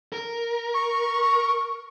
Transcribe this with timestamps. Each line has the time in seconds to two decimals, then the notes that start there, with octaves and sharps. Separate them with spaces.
0.13 A#4
0.74 C#6